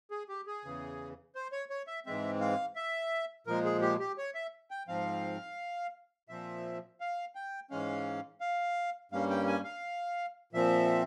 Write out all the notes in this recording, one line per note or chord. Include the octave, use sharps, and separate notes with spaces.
G#4
G4
G#4
E2 C#3 E3
C5
C#5
C#5
E5
G#2 E3 G#3 C4 E5
F5
E5
A#2 F3 G#3 A#4
G#4
G4
G4
C#5
E5
G5
G#2 F3 C4 F5
A#2 F3 C4 E5
F5
G5
G#2 E3 G#3 C#4 F5
F5
G2 G3 A#3 C#4 F5
G5
G#5
F5
A#2 F3 C4 E5